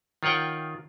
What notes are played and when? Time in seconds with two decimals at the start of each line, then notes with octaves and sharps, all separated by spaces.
0.23 D#3 F4 C#5 F#5 G5